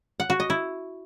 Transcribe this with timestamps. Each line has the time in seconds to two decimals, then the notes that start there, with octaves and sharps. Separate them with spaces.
0.20 F#5
0.30 F#4
0.40 D#5
0.50 E4